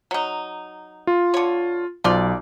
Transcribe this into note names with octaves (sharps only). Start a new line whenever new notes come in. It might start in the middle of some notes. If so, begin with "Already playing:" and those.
F#3 D#4
F4
D3 C#5
B1 F3 F4 D5